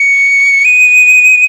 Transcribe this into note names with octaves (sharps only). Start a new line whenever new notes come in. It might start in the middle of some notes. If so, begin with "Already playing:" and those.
Already playing: C#7
D#7